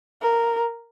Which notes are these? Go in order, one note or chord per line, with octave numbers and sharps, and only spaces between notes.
A#4